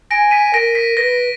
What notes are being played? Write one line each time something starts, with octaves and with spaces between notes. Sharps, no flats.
G#5 A#6 D7
B6 D#7
A#4 A#6 D7
B6
B4 A#6